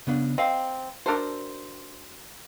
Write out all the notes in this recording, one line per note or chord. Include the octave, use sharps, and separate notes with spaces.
C#3 B3 D4
C4 D#5 F5
D4 F#4 A4 A#4 C5